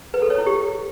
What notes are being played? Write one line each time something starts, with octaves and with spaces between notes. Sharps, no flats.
B4
A4
C#5
E4
G4